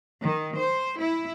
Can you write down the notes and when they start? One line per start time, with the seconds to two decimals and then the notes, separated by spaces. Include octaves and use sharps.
0.22 D#3
0.58 C5
0.99 E4